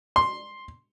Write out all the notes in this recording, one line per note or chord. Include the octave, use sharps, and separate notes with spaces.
C6